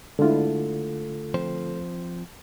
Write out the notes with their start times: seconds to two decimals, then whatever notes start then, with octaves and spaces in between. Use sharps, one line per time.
0.19 D3 G#3 A3 D4 E4 F4 A4
1.34 F3 C4 C5